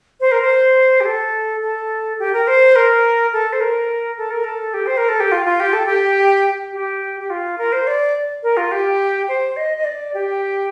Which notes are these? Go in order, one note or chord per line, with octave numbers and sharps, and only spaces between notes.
C5
A#4
C5
G4
A4
A4
G4
A#4
C5
A#4
A4
C5
A#4
A4
A#4
A4
G4
C5
A#4
A4
G4
F4
F4
G4
A4
G4
G4
G4
F4
A#4
C5
D5
A#4
F4
G4
C5
D#5
D#5
D5
G4